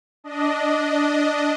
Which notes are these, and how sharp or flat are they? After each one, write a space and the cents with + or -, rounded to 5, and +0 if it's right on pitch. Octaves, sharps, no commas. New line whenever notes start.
D4 -5 D#5 +0